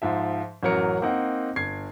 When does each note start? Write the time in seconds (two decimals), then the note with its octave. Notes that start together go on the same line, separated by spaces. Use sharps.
0.02 G#2 F3 E5
0.63 A1 F#2 F#3 A#4 C#7
1.02 A#3 C4 D#4 F#5
1.56 G1 G#6 C7